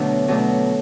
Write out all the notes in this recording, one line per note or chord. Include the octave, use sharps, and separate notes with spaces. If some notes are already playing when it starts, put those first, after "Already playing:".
Already playing: B2 D3 F#3 A3 D4
B2 F#3 A3 D4